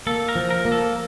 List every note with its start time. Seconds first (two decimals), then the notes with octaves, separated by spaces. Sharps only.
0.07 A#3 A4
0.28 A#4
0.36 F3
0.51 A#4
0.65 A#3
0.72 A4